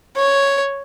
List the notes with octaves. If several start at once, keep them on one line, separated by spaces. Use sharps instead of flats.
C#5